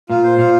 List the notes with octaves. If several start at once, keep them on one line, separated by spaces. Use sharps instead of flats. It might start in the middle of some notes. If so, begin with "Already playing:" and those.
A#2 F4
C5
A#2 F4